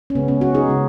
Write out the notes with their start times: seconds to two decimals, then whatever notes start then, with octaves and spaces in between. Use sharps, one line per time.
0.10 C#4
0.15 C#3 G#3 B3
0.28 C#4
0.41 C#4 F#4
0.55 D#4 G#4
0.69 C#3 G#3